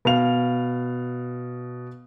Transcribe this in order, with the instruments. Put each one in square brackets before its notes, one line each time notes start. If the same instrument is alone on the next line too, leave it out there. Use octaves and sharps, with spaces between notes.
[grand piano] B2 F5 F7